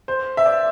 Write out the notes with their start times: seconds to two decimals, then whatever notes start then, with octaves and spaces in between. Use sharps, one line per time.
0.08 C5
0.37 E5
0.46 D5